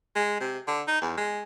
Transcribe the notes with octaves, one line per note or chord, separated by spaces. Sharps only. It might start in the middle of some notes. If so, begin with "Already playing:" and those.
G#3
C3
D3
D#4
E2
G#3